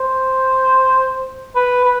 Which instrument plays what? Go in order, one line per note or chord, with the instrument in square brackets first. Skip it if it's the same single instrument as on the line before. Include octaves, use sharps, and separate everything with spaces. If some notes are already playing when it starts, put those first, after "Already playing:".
Already playing: [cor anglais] C5
B4
B4